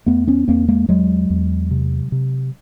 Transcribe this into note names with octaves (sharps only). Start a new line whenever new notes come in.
E2 A3 B3
B3 C#4
E2 A#3 C4
G#3 A#3
E2 F#3 G#3
E2
C3
C3